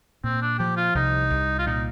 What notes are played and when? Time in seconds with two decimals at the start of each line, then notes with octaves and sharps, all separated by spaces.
0.24 A#2 C4
0.42 D4
0.59 F3 G4
0.77 F4
0.95 C2 D#4
1.30 C2
1.59 F4
1.67 A#2 D#4